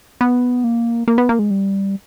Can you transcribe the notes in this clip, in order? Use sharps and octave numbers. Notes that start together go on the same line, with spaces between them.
B3
A#3
A#3
B3
A#3
G#3
G3